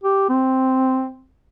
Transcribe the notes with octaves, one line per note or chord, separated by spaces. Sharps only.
G4
C4